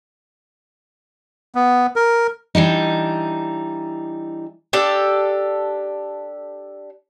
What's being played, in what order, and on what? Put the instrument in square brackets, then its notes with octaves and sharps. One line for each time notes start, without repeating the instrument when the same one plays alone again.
[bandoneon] B3
A#4
[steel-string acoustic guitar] E3 G3 D4 D#4
[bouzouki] D4 G4 A4